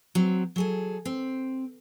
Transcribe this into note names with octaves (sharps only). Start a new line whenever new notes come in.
F#3 C4
F#3 G#4 A4
C4